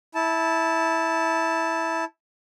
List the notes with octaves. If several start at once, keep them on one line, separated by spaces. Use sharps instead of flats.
E4 A5